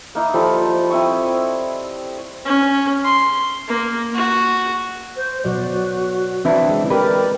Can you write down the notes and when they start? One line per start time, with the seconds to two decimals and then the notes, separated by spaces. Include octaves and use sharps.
0.15 A#3 D#4 E4
0.34 F3 G3 A4 B5
0.90 C4 E4 D#5 C#6
2.45 C#4
3.04 C6
3.68 A#3
4.14 F#4
5.17 C5
5.44 B2 F#3 F#4 D5
6.45 E3 C4 D4 E4
6.69 G#3
6.90 G4 A#4 B4 D5